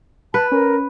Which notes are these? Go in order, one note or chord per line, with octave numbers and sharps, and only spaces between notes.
B4 A5
C#4 A#4